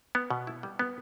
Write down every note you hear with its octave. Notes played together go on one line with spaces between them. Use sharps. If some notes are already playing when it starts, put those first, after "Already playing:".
B3
B2
E4
G3
B3